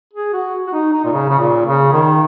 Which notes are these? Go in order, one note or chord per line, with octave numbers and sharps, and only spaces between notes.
G#4
F#4
F#4
D#4
D#4
A#2
C#3
C#3
A#2
C#3
D#3